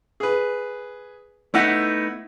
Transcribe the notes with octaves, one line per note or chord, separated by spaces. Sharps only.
G#4 B4
A3 B3 D#4 E4 F#5